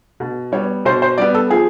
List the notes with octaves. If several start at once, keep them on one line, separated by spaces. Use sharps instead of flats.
B2
G3 B3 C#5
B2 C5
C5
G3 B3 D5
A4
F3 G#4